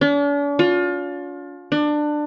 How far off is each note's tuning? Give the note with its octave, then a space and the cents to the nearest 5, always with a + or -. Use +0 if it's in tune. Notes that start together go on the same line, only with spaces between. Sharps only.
D4 -45
F4 +30
D4 +20